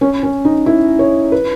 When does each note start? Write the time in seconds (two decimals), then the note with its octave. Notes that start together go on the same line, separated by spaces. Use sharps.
0.01 C#4
0.23 C#4
0.45 D#4
0.66 E4
0.99 C#5
1.32 B4